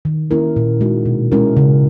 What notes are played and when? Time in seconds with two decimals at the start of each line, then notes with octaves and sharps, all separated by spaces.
0.05 D#3
0.31 A#3 C#4 E4 A#4
0.56 A#2
0.81 G#3 D#4 F#4
1.06 B2
1.32 G#3 C#4 E4 A#4
1.57 C#3